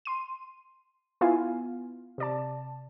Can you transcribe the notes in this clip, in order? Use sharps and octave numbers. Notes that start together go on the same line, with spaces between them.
C6 D#7
B3 E4 F4 F5 G#5
C3 D5 A5